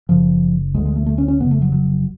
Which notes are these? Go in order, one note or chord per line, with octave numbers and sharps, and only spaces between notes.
F#1 F#2 C#3 F3
D2 D3 G#3
G#3
A3
A3
C#4
C#4
F1 F2 C#3 B3
A3
F#3
F#3